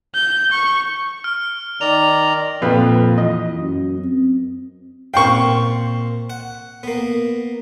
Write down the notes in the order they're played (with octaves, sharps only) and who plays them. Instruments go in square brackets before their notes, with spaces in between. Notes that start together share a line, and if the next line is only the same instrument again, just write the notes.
[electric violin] G6
C#6
[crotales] F6
[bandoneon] D#3 D5 A#5 [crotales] F7
[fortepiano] F2 B4 F5 [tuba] A#2
[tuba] E3 [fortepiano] D#5
[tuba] F#2
C4
[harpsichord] A#2 C4 F5 [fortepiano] G5 C#6
[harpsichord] F#5
A#3 B3